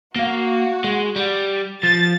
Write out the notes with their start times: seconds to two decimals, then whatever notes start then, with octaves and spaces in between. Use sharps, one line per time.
0.16 A#3 F#4 F5
0.84 G#3
1.16 G3
1.83 F3 A6